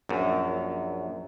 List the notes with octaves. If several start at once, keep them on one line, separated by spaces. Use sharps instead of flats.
A#1 F#2